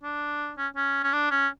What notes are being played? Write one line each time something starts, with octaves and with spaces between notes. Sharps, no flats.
D4
C#4
C#4
C#4
D4
C#4